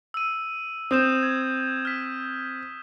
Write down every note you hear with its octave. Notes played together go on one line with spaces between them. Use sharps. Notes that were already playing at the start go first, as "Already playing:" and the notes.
E6 D#7
C4 D#6 G6 E7
G#6
F6 B6